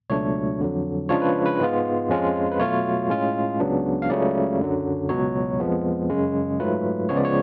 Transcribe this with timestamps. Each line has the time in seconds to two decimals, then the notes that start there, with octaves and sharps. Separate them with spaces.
0.10 C#2 B2 F#3 A3 D4 C#5
0.60 F2 D3 F#3
1.09 C#3 F3 G#3 D4 F4 C#5
1.22 B4
1.46 B4
1.59 G#2 G#3 B3 F4
2.09 F2 F3 G#3 C#4 F4
2.52 B4
2.59 B2 F#3 A3 F4 C#5
3.09 A2 G#3 C#4 F4
3.60 C#2 C#3 F#3 B3 D4
4.02 F5
4.09 C#2 C#3 F#3 A3 D5
4.59 F#2 D3 F#3
5.09 C#2 B2 F#3 C#5
5.60 F2 F3 G#3 B3
6.10 F#2 C#3 G#3
6.60 G#2 F#3 A3 F4 B4
7.09 C#2 C#3 F3 G#3 B3 C#5
7.16 D5
7.25 C#5